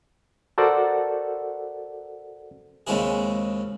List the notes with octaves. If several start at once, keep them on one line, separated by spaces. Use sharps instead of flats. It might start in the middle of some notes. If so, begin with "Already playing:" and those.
F#4 A4 A#4 C5 D5 F#5
D#2 C#3 G#3 C4 E4 G#4